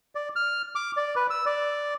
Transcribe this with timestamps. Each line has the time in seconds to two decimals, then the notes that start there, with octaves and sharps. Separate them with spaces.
0.15 D5
0.36 F6
0.75 D6
0.97 D5
1.16 B4
1.30 E6
1.46 D5